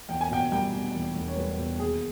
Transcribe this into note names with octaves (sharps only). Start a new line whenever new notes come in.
E2 G5
G#5
B2 G5
G3 G5
B2
E2
E1
C#5
G3 B4
B2
D#2 G#4